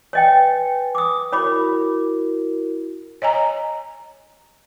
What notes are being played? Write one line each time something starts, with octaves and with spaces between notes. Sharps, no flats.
B4 C#5 D#5 G5 G#5
D6 D#6
E4 F#4 A#4 C#5 B5 D6
C#5 D#5 G#5 A#5